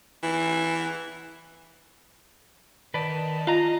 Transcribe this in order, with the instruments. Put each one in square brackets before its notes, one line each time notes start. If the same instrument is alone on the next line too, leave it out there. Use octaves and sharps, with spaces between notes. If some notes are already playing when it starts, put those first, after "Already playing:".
[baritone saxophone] E3
[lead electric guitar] D#3 [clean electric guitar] B4 D5 [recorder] A5
[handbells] F4 [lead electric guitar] D#5 [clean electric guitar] F5 A#5